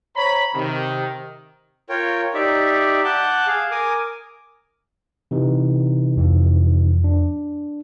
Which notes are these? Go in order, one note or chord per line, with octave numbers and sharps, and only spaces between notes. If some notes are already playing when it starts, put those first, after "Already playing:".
C5 C#5 A#5 B5
C3 D#3
F4 A#4 C#5 G5
D#4 G4 D5 E5
F#5 A5 D6 G6
G#4 F5
A#4 G#5 D6 D#6
C3 E3 D#4
F2
D4